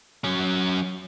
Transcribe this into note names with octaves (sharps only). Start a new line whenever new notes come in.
F#3 C#4